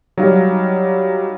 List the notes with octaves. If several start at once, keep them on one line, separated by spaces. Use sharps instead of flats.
F#3 G3 D#4 F5